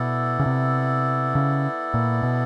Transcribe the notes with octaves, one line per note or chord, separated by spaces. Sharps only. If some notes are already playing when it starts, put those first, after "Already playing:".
Already playing: B2 B3 E4 A4 D5
C#3
C3
C#3
A#2
B2